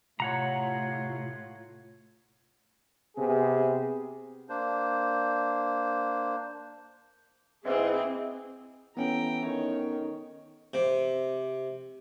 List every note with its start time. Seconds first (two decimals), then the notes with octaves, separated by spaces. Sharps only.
0.20 A2 C3 F4 C#5 F#5 A#5
3.16 C3 B3 G#4
4.49 A#3 D4 C5
7.65 G#2 E3 C4 G#4
8.97 E3 B3 C#4 A4 G5 A#5
9.45 D#3 C#5
10.74 C3